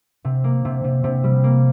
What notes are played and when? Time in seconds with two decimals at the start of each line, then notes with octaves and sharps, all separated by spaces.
0.25 C3
0.44 A#3
0.65 C3
0.84 C3
1.04 C3
1.24 G3
1.44 A#3